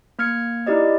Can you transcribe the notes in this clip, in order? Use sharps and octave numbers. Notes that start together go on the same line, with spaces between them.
A#3 F6 G#6 C#7
D#4 E4 G4 D5 D#5